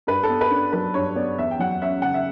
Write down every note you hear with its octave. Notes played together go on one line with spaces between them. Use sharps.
G2 B4
A4
B3
B4
D4
F#3 B4
G2 C#5
B3 D5
E2 E5
G5
F#3 F#5
C#4 E5
C#3 F#5
E5